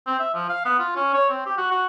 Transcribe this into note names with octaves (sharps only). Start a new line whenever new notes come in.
C4
E5
F3
F5
B3
F4
C#4
C#5
C4
G4
F#4
F#4